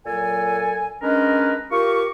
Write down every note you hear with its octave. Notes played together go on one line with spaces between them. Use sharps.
A#2 F#3 A4 G#5
G#3 C#4 D4 A#4 B4 D#5
F4 G4 A#4 C#6